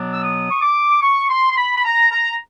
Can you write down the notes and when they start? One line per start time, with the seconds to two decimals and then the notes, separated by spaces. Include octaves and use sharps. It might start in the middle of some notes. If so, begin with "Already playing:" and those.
Already playing: B2 F#3 B3 D4
0.12 E6
0.21 D#6
0.51 C#6
0.62 D6
1.02 C#6
1.30 C6
1.51 C6
1.57 B5
1.77 B5
1.85 A#5
2.12 A#5